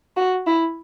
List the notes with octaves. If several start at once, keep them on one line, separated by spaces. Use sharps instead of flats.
F#4
E4